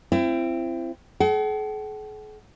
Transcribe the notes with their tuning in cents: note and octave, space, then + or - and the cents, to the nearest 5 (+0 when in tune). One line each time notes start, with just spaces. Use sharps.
C4 +0 E4 +35
G#4 +45 F#5 +45